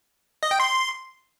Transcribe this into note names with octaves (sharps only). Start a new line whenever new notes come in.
D#5
G5
C6